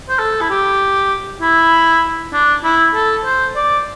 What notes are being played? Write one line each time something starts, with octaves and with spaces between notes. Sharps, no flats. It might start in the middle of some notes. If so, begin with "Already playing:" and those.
C5
A4
E4
G4
E4
D4
E4
A4
C5
D5